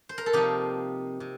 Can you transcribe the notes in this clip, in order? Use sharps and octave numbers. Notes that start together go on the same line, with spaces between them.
C5
A#4
A4
C3 F3 A#3 D#4 G4
C3